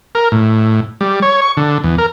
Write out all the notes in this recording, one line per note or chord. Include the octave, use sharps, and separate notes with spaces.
A#4
A2
G3
C#5
C#6
D3
E2
A#4